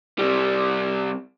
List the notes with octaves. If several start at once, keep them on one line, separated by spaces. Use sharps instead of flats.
C3 G3